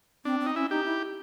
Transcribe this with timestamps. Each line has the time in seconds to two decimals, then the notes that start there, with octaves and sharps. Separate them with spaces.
0.25 C4 D4
0.40 C4
0.46 D#4
0.55 C#4 E4
0.70 D#4 G4
0.85 E4